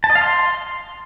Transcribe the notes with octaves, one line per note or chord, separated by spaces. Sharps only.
A5
D#5
F5
C6